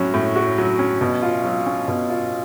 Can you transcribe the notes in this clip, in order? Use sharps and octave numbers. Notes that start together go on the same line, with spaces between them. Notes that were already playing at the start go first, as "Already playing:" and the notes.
Already playing: A2 F#3 C#4 F#4
A2
F#4
F#3
C#4
B2
F4
F#3
C#4
B2
F4